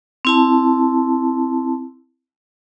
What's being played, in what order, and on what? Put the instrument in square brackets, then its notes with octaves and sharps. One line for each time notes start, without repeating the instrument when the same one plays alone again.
[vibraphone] C4 E4 A5